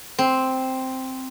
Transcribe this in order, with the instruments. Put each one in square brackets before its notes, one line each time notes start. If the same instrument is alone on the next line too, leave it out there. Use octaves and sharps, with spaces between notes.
[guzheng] C4